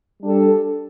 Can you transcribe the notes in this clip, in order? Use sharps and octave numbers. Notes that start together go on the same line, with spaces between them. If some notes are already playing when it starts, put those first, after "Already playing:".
G3 D4 A4